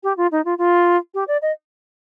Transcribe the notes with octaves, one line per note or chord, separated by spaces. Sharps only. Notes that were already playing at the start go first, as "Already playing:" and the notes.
G4
F4
D#4
F4
F4
G4
D5
D#5